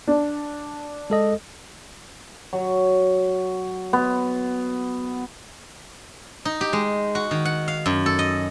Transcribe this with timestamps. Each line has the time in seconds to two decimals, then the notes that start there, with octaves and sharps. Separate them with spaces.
0.07 D4
1.10 G#3 A4 D#5
2.53 F#3
3.93 B3
6.45 D#4
6.61 G4
6.73 G#3
7.15 F#4
7.31 D#3
7.45 F#5
7.68 F5
7.86 F#2
8.06 A4
8.19 D#5